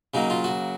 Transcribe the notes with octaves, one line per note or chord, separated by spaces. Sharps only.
C#3 F#3 A#3 D#4
F4
F#4